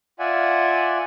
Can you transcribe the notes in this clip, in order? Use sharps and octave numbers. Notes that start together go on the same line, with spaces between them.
F4 D5 E5 F#5 G#5